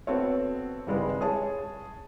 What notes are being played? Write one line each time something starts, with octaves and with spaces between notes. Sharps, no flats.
B3 C4 F#4 A4 C#5
G#1 C#3 G3 G#3 B4
G#4 C#5 A5